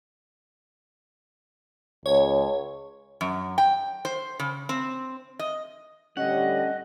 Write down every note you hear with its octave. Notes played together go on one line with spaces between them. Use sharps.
C#2 C#5
F#2
G5
C5
C#3
C4
D#5
A2 D3 G3 C#4 D#5 F#5